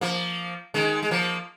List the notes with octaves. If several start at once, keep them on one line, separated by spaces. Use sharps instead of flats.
F3 A#3
D#3 G#3
G#3
F3 A#3